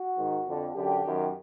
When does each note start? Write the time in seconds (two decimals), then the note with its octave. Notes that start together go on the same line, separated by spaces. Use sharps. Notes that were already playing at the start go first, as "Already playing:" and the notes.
Already playing: F#4
0.16 G#2 D#3
0.45 F2 D3
0.74 F#2 D3 G4
1.04 F#2 D#3